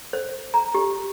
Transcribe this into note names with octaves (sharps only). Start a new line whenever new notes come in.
C5
A#5
G4